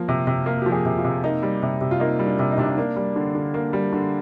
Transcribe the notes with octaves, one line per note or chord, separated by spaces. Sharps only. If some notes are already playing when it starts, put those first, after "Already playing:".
Already playing: F3 A#3 A#4
C3
C3
A#3 A#4
F3 G4
G#4
C3
F4
C3
A#3 D#4
G3
C3
C3
F4
A#3 D#4
G3
D4
C3
D#4
C3 D4
D#4
A#3 D4
G3
D3
D3
A#3
G3
D3